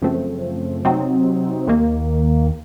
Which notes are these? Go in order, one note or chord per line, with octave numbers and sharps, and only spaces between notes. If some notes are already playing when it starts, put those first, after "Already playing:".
F#2 C#3 F3 A3 C4
C3 F#3 C4 D#4
D#2 D#3 A#3